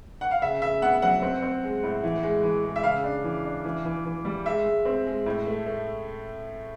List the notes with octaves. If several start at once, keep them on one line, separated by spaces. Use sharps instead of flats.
F#5
F5
C#3 E5
C#3 E5
B3 F#5
F#3 F#5
C4
C4
G#3
A2
E3
G#3
E3
G#3
E5
C#3 F5
D4
E3
D4
E3
E3
E3
G3
G#3 E5
G#3
C4
G#3
A2
A3
A3